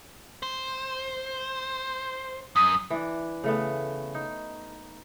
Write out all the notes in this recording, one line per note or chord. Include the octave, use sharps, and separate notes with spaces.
C5
F#2 D#6
E3 D4
C#3 A3 B3
D#4